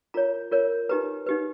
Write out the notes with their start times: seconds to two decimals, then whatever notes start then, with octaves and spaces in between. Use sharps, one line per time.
0.14 F4 A#4 C#5 A#5
0.52 F4 A#4 C#5
0.89 D#4 G4 B4 A#5
1.26 D#4 G4 B4